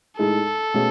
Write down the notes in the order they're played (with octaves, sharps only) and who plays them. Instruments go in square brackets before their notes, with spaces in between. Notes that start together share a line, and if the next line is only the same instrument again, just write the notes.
[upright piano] A2 G#3 D#4 G#4 [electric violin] A4
[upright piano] B2 A3 C#4 G#4